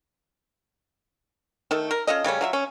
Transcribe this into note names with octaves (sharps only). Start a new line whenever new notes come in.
D#3 A3 A4
A#4
C#4 F4 A4 D#5
C#3 G3 A3 C#4
F#3 F4 E5
C#4